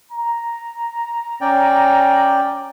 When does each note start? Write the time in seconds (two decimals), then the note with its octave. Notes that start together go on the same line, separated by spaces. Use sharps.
0.12 A#5
1.41 C#4 D5 G5